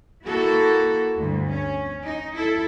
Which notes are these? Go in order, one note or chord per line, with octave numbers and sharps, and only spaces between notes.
A#3 E4 F#4 A4
D2 G2
C#4
D#4
E4 A4